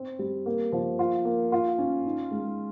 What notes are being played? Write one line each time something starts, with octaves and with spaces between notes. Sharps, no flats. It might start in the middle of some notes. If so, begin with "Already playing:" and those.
Already playing: C4
G3
A#3
F3
F4
A#3
F4
C#4
D#4
G#3